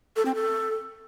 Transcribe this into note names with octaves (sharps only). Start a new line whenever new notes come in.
A4
C4
A4